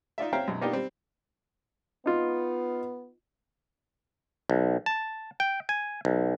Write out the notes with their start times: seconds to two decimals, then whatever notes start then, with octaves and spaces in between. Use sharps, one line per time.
0.18 D#4 F4 D5 E5
0.33 C4 C#4 E5 F5 G5 A#5
0.48 B1 F#2
0.61 A#3 B3 D4 D#4 F4 G4
0.73 G3 C4
2.06 B3 D#4 F4
4.50 B1
4.86 A5
5.40 G5
5.69 G#5
6.05 B1